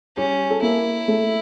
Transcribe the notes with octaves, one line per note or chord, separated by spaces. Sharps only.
G3 C#4 G4
A4
A#3 E4 A#4
A3 A4